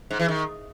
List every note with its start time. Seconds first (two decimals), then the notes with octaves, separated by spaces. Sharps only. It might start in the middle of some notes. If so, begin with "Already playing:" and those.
0.11 G#2
0.19 E3
0.28 D#3